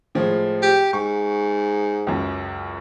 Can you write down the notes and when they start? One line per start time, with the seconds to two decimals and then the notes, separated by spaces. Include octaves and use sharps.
0.15 A2 F3 G#3
0.62 G4
0.93 G#2 C#6
2.07 C#2 F#2